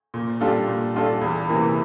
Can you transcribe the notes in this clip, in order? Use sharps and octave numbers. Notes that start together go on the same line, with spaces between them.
A#2
G3 D4 F4 A4
A#2
G3 D4 F4 A4
E2
C3 E3 A#3